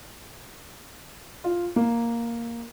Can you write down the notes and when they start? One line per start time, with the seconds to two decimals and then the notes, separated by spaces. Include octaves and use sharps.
1.44 F4
1.76 A#3